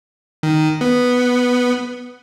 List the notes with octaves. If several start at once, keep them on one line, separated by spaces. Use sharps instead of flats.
D#3
B3